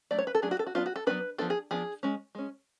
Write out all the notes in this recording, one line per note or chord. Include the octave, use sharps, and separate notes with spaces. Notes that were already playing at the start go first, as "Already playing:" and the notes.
F#3 A3 D4 D5
C#5
B4
A4
F#3 A3 D4 G#4
F#4
A4
F#4
F#3 B3 D4 F4
F#4
A4
F#3 B3 D4 B4
F3 B3 D4 A4
G#4
F3 B3 D4 G#4
G#3 C#4
G#3 C#4